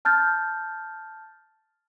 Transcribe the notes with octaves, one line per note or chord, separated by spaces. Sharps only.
A5 F6 G6 A6